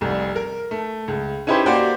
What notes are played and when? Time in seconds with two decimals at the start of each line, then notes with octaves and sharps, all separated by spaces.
0.01 F1 C2
0.36 A#4
0.71 A3
1.08 C#2
1.47 C#4 D#4 E4 G4 B4 C5
1.66 A#3 F#4 G4 C5 D5 G5